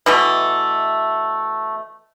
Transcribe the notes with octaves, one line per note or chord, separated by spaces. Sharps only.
B2 E3 A3